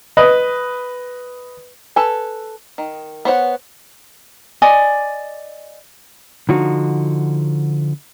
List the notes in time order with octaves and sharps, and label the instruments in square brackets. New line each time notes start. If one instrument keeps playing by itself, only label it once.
[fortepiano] B4 D#5
[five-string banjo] A4 B4 G#5
D#3
B3 C5 C#5 F#5
[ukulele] D5 D#5 G#5
[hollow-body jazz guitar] D3 F3 D#4 F#4